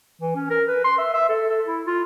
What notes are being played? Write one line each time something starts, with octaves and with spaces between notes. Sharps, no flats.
E3
C#4
A#4
B4
C6
E5
E5
A4
A4
E4
F4